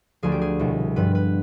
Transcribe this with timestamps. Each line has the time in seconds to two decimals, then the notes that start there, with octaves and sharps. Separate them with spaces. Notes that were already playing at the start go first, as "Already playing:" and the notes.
0.23 D2 D3 F3 G#4
0.32 G4
0.42 G#4
0.59 C2 B2
0.96 G2 F3 B4
1.15 B4